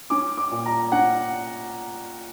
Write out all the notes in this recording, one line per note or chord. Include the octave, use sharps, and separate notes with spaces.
C#4 D6
D6
A#2
A#5
C#4 F#5